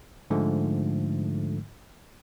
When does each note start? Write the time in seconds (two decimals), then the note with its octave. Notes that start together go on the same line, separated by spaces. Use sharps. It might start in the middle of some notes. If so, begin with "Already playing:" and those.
0.30 G#2 D3 F3 A3